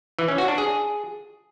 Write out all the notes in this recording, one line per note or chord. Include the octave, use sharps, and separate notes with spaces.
E3
C#4
F#4
D4
G#4